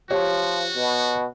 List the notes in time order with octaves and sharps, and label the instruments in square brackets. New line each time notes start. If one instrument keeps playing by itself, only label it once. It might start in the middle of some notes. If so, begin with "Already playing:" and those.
[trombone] F3 [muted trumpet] F#4 [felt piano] G4 C#5
[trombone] B2